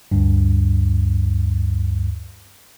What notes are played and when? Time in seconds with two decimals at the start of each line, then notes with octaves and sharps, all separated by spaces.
0.11 D2 G2